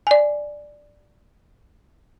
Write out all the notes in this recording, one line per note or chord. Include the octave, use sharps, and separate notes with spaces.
D5 G#5